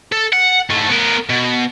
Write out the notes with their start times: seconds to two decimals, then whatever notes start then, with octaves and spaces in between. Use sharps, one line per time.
0.12 A4
0.33 F#5
0.70 G#2 A3
0.89 B3 A#4
1.30 B2